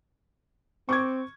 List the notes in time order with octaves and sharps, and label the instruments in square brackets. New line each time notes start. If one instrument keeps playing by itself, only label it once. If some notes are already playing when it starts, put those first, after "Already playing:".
[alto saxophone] C4 [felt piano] C#6 D6 G#6